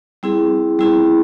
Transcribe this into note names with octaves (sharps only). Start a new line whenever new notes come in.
G3 C4 E4 G#4
G3 C4 E4 G#4